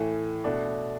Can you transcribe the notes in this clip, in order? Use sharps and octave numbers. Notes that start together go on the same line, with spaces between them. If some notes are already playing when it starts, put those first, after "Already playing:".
Already playing: A2 E3 A3
B2 A3 D4